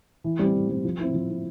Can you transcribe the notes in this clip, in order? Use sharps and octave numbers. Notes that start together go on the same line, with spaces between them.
E3
G3 C4
E3
G3 C4
F3
C4 E4
F3
C4 E4